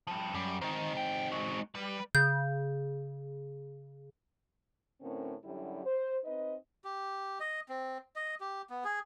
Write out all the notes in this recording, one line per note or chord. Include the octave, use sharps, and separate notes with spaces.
F3 G3
F#2 G3
D#3 C4 D#4
G5
G#3 F#4
G3 B4
C#3 G6
A2 D3 C4 C#4 A#4
F#2 D3 G3 E4 G4
C5
C4 D#4 B4 D#5
G4
D#5
C4
D#5
G4
B3
G#4